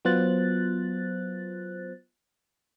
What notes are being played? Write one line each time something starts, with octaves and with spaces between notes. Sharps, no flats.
F#3 B3 F4 C5 F#6 A6